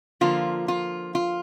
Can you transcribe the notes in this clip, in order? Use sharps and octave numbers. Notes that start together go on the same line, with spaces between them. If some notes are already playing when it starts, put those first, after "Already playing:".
D3 F3 A#3 F4
F4
F4